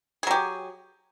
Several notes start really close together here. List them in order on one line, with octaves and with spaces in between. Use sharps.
G#4 F#3 G4